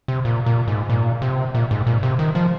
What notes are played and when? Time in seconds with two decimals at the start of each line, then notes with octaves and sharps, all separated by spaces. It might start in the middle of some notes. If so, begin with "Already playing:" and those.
0.08 C3
0.25 A#2
0.46 A#2
0.68 G#2
0.90 A#2
1.22 C3
1.55 A#2
1.71 G#2
1.87 A#2
2.03 C3
2.19 D#3
2.35 F3